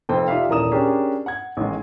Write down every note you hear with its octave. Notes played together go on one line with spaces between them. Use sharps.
F1 F2 C4 A4 C5 G5
D#4 F4 G4 D5 E5 F5
D#1 E3 A#4 D5 D#6 E7
C#4 D4 G4 G#4 A#4
F#5 G#6
A1 D#3 G#3